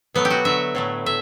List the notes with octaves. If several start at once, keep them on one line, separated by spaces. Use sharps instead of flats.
B2 F#3 A3 B3
G4
F#4
D3 F#3 A3 E5
A2 F#3 A3
A2 E5